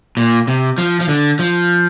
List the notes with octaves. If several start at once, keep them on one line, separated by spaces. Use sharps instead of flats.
A#2
C3
F3
F3
D3
F3